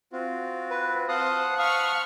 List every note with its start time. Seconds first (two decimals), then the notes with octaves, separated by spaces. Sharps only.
0.12 C4 F4 F#4
0.70 B4
1.09 C5 F5 F#5 A5 D#6 F#6
1.59 F5 B5 C#6 D#6 F6